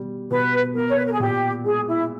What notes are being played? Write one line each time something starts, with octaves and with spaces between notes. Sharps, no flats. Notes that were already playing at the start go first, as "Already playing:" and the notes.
Already playing: B2 G3
B2 B4
B3 A#4
C#5
B4
A#4
G#4
A#2 G4
G#3 G#4
E4